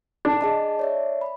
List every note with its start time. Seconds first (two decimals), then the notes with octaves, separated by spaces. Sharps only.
0.25 D4
0.41 G#4 D#5 A5
0.79 C#5 D5 E5
1.21 B5